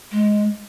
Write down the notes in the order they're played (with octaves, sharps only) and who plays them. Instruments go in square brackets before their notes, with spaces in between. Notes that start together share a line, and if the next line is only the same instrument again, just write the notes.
[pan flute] G#3